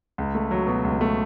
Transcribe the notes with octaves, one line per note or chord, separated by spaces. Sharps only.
C#2
A3
F#3
B2
C#2
A3